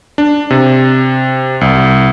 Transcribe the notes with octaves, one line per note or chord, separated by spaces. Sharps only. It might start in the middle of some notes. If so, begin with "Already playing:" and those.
D4
C3
C2